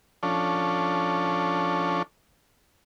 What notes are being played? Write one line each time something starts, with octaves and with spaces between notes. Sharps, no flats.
F3 C#4 D4 A4